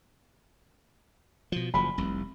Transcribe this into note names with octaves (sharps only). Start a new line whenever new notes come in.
B2 F3
F#1 F3 B5
F1 C2